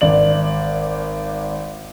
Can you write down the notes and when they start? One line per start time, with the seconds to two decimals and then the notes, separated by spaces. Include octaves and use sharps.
0.01 G#1 D5 F#7